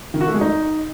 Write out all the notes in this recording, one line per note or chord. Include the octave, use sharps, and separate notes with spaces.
D#3
F#4
A3
G#3
D#4